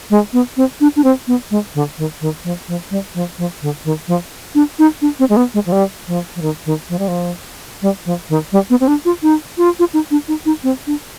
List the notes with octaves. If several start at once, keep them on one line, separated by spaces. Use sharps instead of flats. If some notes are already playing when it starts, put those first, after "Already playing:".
G#3
B3
C4
D4
D4
C4
B3
G#3
D3
D#3
D#3
F3
F3
G3
F3
F3
D3
D#3
F3
D4
D#4
D4
C4
G#3
B3
G#3
F3
G3
F3
F3
D#3
D#3
F3
G3
F3
G3
F3
D#3
G3
B3
C4
D4
F4
D#4
F4
F4
D#4
D4
D#4
D#4
C4
D4